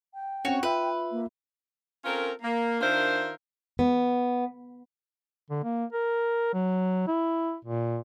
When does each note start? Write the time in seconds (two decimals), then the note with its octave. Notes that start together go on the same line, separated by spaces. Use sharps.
0.14 G5
0.45 C4 C#4 F#4 C#5
0.63 F4 B4 E5
1.11 A#3
2.04 C4 C#4 F4 A4 A#4
2.42 A#3
2.81 D#3 D4 F4 A#4 C5 E5
3.79 B3
5.50 D3
5.64 A#3
5.92 A#4
6.53 F#3
7.07 E4
7.65 A#2